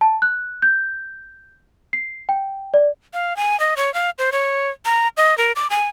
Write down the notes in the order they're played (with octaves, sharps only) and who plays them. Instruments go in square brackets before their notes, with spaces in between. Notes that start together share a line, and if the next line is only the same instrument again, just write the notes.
[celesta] A5
F#6
G6
C7
G5
D5
[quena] F5
G#5
D#5
C#5
F5
C5
C#5
A#5
D#5
A#4
D6
G#5